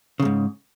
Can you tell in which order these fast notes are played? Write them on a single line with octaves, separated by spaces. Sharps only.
C#3 E2 G#2